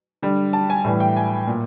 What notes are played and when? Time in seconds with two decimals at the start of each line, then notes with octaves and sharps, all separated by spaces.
0.22 D3 G3
0.53 A5
0.70 G#5
0.84 A2 E3 G3
1.00 G5
1.17 G#5
1.47 A#2